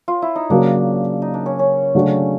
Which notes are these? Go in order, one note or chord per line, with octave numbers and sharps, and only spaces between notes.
F4
E4
D#4
C#3 F#3 A#3 D4
D#4
D4
C#4
C#4
C#3 F#3 A3 D4 F#4